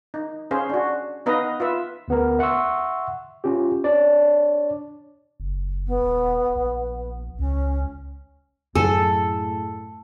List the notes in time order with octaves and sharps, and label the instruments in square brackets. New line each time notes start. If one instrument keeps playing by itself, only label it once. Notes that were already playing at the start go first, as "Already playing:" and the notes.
[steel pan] D#4
C#4 G#4 C5 F5
D4 F#4
B3 D#4 B4 D#5 F5 A#5
F4 B4 E5
[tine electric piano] D2 B3 A#4
E5 F#5 C6 C#6 E6
C#4 F4 G4
D4 C#5 D5
[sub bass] F#1
[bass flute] B3
[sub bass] D#1
A#1
[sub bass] C#2 [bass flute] C#4
[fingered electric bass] F#2 [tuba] A2 [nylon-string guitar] G#4 G#5 [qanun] A4